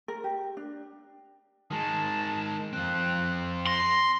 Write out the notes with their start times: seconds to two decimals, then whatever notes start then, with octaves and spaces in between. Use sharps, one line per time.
0.08 A#4
0.24 G4
0.57 D4
1.71 D#3 G#3 A5
2.73 F2 C4 F#6
3.67 C6 A#6